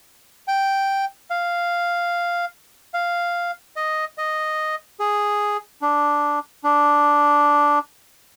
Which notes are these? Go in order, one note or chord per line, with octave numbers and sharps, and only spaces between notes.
G5
F5
F5
D#5
D#5
G#4
D4
D4